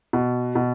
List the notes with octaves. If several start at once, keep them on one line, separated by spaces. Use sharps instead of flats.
B2
B2